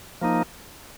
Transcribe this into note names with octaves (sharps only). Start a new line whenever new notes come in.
F3 A#3 D#4